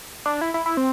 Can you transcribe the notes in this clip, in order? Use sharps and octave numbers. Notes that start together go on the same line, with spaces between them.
D4
E4
E4
E4
C4